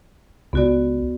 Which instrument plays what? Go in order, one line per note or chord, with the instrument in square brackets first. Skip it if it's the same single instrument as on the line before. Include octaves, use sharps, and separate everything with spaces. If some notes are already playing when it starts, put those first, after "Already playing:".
[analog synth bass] C#2 [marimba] B3 F#4 D5